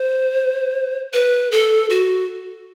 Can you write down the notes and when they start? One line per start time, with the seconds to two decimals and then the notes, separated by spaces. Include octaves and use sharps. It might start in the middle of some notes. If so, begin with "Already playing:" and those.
Already playing: C5
1.13 B4
1.51 A4
1.90 F#4